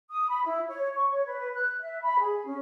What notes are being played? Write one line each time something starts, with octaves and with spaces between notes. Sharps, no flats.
D#6
B5
E4
C#5
C#6
C#5
B4
F#6
E5
B5
G#4
C#4